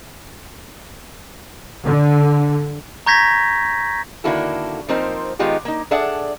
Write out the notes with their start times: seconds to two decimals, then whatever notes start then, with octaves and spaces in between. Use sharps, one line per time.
1.85 D3
3.06 A#5 C#6 G6 G#6 A#6 B6
4.24 D3 D#3 A#3 E4 F#4 A4
4.89 F3 A#3 C4 D#4 A#4 C5
5.39 D#3 G#3 B3 D#4 F4 G4
5.65 A#3 D#4
5.91 D4 G#4 A4 D5 E5 F#5